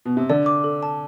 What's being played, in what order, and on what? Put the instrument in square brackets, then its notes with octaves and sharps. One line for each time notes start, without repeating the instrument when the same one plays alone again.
[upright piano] B2
C3
[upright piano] D3 [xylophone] D5
[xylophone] D6
A4
A5